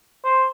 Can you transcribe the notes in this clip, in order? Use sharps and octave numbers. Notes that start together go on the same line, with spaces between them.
C5